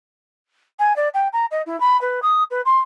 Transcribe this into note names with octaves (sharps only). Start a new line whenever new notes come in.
G#5
D5
G5
A#5
D#5
E4
B5
B4
D#6
B4
C6